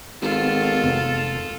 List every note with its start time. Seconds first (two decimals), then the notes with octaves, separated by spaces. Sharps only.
0.22 G#1 B3 F4 A4
0.84 F1